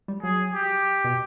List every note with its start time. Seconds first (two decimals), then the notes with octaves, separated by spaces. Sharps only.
0.08 G3
0.23 F#3 G#4
0.54 G4
1.04 B2